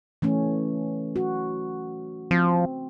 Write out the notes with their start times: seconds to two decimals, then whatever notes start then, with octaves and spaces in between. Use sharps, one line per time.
0.22 E3 A3 C#4
1.16 F#4
2.31 F3 C4